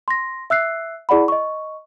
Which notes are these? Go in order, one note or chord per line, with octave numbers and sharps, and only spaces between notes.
C6 A#6
E5 E6 F#6 C7
E4 G#4 D5 F#5 B5
D#5 C#6